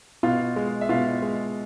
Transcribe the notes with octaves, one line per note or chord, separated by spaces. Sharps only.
B2 F4 F5
G#3
E5
B2 F4 F5
G#3